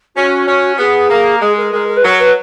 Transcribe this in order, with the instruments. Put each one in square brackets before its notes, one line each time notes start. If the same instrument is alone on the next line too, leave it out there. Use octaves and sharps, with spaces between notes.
[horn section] C#4 [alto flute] F#4
[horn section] C#4
[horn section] B3 [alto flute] G#4
[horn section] A#3
[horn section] G#3 [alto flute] G#4
[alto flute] A#4
[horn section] G#3 [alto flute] A#4
[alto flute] A#4
B4
[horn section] F#3 [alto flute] A#4
[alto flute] B4